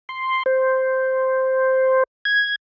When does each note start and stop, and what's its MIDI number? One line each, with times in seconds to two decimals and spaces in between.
0.09 0.43 84
0.46 2.03 72
2.25 2.55 92